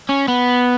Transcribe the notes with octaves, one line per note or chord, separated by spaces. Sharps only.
C#4
B3